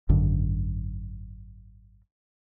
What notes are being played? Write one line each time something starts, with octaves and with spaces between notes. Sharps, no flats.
G#1 F#2 D3